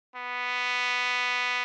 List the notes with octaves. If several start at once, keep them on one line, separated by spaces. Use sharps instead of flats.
B3